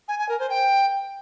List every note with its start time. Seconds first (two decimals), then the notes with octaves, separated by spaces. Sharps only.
0.08 G#5
0.19 G#5
0.29 A#4
0.39 C5
0.50 G5